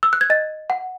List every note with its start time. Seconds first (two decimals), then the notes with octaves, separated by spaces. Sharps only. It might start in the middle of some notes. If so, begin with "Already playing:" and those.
0.03 E6
0.13 F#6
0.21 G#6
0.30 D#5 A6
0.70 F#5